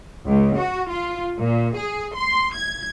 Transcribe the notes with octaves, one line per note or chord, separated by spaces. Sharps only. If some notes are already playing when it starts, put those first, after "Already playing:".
C#2
F#4
F4
A#2
G#4
C6
G#6